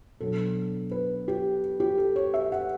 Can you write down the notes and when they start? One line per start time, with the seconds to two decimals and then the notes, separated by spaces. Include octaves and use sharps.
0.20 B2 F#3 B3 D4 A4
0.91 B4
1.28 G4
1.80 G4
1.98 A4
2.16 C#5
2.34 E5
2.52 F#5